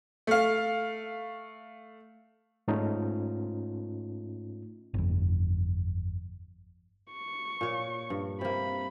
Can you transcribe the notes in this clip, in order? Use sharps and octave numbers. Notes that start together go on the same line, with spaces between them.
A3 F5
G#2 A3 C#4 D#4 F4
G1 F2
C#6
A#2 C#5
G2
C3 A#3 B5